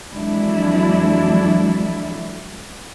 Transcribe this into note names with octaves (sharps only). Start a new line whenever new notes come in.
F2 E3 F#3 G#3 D4 E4